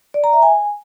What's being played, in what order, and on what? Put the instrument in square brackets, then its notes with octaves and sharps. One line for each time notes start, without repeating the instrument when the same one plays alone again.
[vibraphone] D5
A#5
E5
G#5